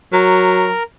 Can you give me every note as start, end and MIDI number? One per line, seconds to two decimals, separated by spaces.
0.12 0.72 54
0.12 0.83 70